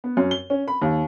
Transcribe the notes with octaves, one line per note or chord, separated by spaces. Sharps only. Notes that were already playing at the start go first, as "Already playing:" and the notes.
B3
F#2
G7
C#4
B5
D#2